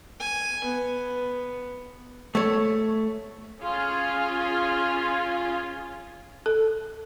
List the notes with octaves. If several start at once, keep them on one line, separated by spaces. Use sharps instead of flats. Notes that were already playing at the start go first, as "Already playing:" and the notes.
G#5
B3
A3 C#5
C#4 F4 G#4
A4